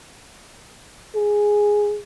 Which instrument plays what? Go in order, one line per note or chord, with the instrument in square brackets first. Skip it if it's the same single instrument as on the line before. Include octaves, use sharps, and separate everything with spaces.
[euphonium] G#4